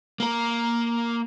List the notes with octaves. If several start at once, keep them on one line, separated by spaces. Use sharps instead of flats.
A#3 A#4